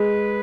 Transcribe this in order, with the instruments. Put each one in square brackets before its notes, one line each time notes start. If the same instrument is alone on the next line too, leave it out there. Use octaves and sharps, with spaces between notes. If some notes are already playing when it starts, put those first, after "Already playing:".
Already playing: [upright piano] G#3 [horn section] B4